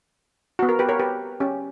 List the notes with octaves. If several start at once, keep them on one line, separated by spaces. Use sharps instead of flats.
B3 F#4
A#4
G4 B4
A#4 C#5
G4 B4
C#4 G4